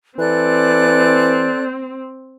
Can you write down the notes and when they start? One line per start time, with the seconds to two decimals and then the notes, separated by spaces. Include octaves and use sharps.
0.18 E3 C4 A4 D5 F#6